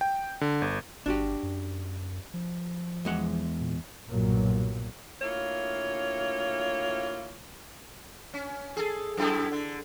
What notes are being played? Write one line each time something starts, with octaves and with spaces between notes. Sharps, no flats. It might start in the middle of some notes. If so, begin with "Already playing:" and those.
G5
D3
G1
G1 D4 F#4 G4
F#2
F3
E2 G#3 F#5
A#2
B1 G2 A#2 F#3
D2 A#3 E4 F4 C#5
C#4
G#4 A4
F#2 E4 A4
D3